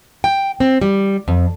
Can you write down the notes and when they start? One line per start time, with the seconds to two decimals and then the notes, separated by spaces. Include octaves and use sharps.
0.24 G5
0.60 C4
0.81 G3
1.28 F2